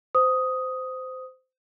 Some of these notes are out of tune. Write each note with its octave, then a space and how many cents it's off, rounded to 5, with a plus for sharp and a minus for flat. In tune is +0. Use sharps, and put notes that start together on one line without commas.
C5 -20 D#6 +5